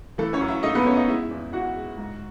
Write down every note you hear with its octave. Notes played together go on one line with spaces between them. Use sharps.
E3 A3 A4
C#4 C#5
F#2
E4 E5
A3 D#4 D#5
B3 B4
A3 C#4 C#5
D#4 D#5
G#3 E4 E5
E2
E2 F#4 F#5
G#3
G#2